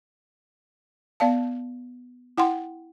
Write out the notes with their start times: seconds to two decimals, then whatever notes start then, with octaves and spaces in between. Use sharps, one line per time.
1.20 B3 D5 F5 A5
2.38 E4 F#5 G5 C6